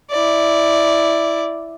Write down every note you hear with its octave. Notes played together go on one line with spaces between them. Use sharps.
E4 D5